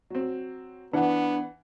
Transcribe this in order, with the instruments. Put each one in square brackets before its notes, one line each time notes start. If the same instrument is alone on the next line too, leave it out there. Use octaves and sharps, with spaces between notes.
[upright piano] F#3 C4
[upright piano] E3 F#5 [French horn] B3 [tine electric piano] D4